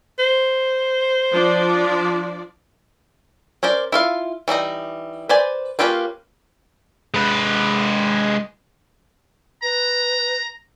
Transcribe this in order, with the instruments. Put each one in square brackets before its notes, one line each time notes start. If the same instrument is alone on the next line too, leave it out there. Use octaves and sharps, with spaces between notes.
[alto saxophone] C5
[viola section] F3 D4 D5
[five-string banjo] C#4 A#4 C5 D5
E4 F4 F5
E3 G3 D#4 A#5
B4 C5 D5 G#5
A#3 C#4 F4 G4 B4
[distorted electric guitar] G#3 B4
[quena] B4 [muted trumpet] A#5